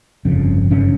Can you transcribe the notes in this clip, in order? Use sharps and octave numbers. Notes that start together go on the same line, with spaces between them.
G1 F2 C#3
G1 F#2 C#3 C#4